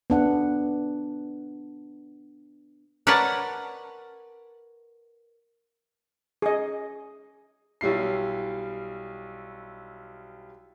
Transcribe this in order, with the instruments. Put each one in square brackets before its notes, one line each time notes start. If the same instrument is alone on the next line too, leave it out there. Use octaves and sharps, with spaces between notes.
[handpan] B3 D4 F#5
[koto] A#4 B4 C#5 D5 F#5 A5
[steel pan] G#4 D#5
[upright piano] B1 G3 E4 C7